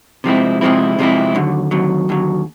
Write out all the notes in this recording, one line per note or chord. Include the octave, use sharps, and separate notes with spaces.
C3 F3 G#3 C4 E4
C3 F3 G#3 C4 E4
C3 F3 G#3 C4 E4
D#2 D3 F#3
D#2 D3 F#3
D#2 D3 F#3